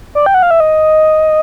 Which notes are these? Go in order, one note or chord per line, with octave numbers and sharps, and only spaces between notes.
D5
G5
F#5
F5
E5
D#5